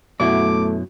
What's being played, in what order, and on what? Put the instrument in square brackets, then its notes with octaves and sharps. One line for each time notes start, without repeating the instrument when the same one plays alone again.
[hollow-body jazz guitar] F#2 B2 E4 [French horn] A3 [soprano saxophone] D6